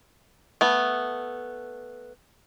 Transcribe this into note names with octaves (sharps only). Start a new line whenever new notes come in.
A3 B3